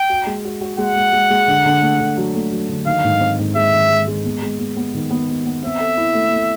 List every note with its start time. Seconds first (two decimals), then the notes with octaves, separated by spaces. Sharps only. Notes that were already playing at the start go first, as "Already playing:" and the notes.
Already playing: G5
0.09 F#4
0.27 G#3
0.45 F#4
0.61 F#4
0.78 G#3 F#5
0.96 G#3
1.13 G#3
1.30 G#3
1.47 D3
1.65 D3
1.82 A3
2.00 D3
2.17 F#3
2.34 A3
2.52 F#3
2.69 D3
2.86 D#3 F5
3.04 G#2
3.20 C4
3.39 G#2
3.55 G#3 E5
3.73 D#3
3.90 G#3
4.07 G#3
4.25 B3
4.42 G#3
4.59 B3
4.77 B3
4.94 D#3
5.10 B3
5.29 B3
5.46 B3
5.63 C4 E5
5.80 A4
5.97 E4
6.15 A3
6.32 A3